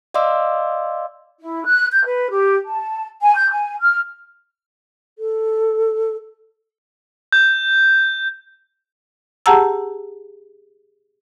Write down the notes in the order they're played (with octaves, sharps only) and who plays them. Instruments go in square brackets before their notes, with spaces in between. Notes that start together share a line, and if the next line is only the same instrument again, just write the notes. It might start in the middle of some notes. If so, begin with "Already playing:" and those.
[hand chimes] D5 D#5 F5 C6 D6 E6
[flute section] E4
F#6
G6
B4
G4
A5
G#5
G6
G#5
F6
[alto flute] A4
[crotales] G6
[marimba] G4 G#4 F#5 A5 A#5 E6